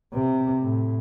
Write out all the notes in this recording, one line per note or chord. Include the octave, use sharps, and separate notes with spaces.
C3
A2